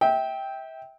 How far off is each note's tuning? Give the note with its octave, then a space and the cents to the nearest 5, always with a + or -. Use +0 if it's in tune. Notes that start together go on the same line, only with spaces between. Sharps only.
E5 -30 G5 +0